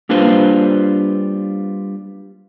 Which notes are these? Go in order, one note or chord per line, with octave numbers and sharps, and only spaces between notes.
G3 A#3 D4 F4 B4 C5